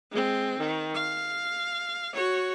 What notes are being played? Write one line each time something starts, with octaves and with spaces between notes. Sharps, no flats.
G#3 C4
D#3
F5
F#4 C#5